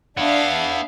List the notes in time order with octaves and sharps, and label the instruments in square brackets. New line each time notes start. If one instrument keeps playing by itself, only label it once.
[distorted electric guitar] B3 E4 [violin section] D4 E5 F5